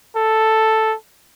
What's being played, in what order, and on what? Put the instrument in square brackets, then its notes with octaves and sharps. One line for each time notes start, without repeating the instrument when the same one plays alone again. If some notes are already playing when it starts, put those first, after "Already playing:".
[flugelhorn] A4